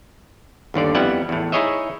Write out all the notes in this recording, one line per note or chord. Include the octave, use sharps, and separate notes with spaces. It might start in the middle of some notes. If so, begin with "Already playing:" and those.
G1 D#2 D3 D5
F2 G3 B3 E4 F#5
E2 A2
D#4 E4 G#4 C#5 D#5 E5